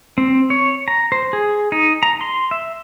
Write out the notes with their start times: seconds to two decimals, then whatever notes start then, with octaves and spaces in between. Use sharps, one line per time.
0.18 C4
0.50 C#5
0.88 A#5
1.12 C5
1.33 G#4
1.72 D#4
2.03 A#5
2.21 C6
2.51 E5